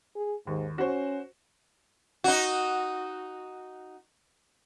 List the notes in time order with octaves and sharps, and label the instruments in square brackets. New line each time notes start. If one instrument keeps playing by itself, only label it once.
[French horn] G#4
[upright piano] D#2 [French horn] G#2
[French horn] C#4 [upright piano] F#4 C5
[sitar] D#4 F#4